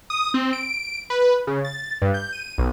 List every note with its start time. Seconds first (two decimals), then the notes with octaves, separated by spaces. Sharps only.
0.10 D#6
0.34 C4
0.53 D7
1.10 B4
1.47 C#3
1.65 A6
2.02 G2
2.14 G6
2.32 D#7
2.58 B1